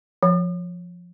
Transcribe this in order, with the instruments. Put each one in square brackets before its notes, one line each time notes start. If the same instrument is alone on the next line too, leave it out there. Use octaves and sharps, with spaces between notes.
[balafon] F3